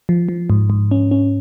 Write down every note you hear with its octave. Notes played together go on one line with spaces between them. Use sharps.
F3
F3
G#2
G#2
C#4
C#4